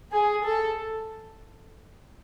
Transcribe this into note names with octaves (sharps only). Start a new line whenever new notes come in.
G#4
A4